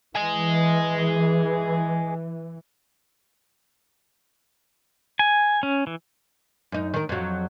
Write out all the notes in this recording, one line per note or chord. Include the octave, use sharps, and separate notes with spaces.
E3 G#4 D#5
G#5
C#4
E3
F#2 D#4
D#3 A#4
F2 F#3